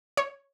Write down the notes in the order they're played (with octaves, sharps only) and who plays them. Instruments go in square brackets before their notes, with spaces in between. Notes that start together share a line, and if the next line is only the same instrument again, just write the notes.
[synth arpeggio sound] C#5